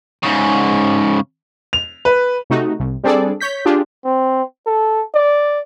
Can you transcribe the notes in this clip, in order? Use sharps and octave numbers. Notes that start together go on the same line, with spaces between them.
G#2 C#3
F7
B4
C3 A3 D#4 F#4
C2
G3 C4 D4 G#4 A4 D5
C#5 G6 B6
D4 F4 G4 G#4
C4
A4
D5